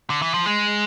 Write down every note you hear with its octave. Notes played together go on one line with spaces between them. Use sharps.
D3
E3
F3
G#3